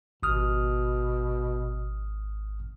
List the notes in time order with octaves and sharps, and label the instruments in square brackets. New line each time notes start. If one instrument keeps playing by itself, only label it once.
[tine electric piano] G#1 D#6 F6 [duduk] B2